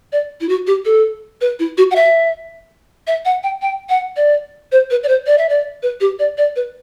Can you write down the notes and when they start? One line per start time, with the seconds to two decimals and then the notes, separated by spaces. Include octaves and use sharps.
0.12 D5
0.41 E4
0.49 F#4
0.67 G4
0.85 A4
1.41 B4
1.59 E4
1.78 F#4
1.91 F#5
1.96 E5
3.07 E5
3.25 F#5
3.43 G5
3.62 G5
3.89 F#5
4.16 D5
4.72 C5
4.91 B4
5.03 D5
5.08 C5
5.27 D5
5.38 E5
5.49 D5
5.83 B4
6.01 G4
6.19 D5
6.38 D5
6.56 B4